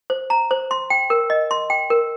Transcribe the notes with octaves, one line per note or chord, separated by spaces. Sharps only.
C5
A#5
C5
C6
G5
A#4
D#5
C6
G5
A#4